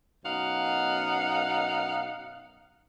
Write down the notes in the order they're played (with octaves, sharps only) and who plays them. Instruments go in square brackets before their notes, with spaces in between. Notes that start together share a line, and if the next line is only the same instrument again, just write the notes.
[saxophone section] F#2 B2 D#4 F5 F#5